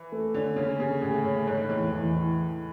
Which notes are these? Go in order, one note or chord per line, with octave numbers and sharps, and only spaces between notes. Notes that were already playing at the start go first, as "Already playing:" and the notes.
Already playing: E3
A3
D3 C#4
C#3 C#4
C#3 G#4
A2 G#4
A2 C#5
G#2 C#5
E2 A2
E2
E3